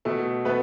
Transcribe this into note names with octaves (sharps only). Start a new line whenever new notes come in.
B2 A3 A4
A3 B3 B4